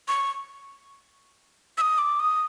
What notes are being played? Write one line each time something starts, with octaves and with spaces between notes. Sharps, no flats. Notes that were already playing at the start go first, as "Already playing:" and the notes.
C#6
E6
D#6
D6
D#6